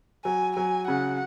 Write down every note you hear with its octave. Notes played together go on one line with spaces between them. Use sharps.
F#3 G#5
F#3 G#5
C#3 F#5